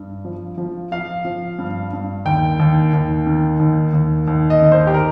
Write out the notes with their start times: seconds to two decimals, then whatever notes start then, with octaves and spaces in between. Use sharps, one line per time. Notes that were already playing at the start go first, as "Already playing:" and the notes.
Already playing: G2
0.25 F3
0.58 F3
0.92 F3 F5
1.25 F3
1.59 G2
1.93 G2
2.25 D#2 G5
2.60 D#2
2.93 D#2
3.26 D#3
3.60 D#2
3.94 D#2
4.28 D#2
4.50 D#5
4.61 D#3
4.72 C5
4.87 G4
4.94 A#4